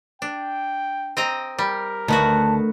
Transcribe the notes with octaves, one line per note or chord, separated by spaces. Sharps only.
D4 G5
C4 D#5 A#5
G3 A#4
D2 D#3 B3 F#4 A5